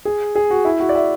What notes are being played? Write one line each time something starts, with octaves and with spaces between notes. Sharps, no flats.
G#4
G#4
F#4
E4
F#4
D5
E5